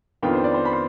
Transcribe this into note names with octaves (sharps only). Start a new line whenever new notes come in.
F2 D#3 B3 D4 F4 G5
C5
D5
C5
B5
C6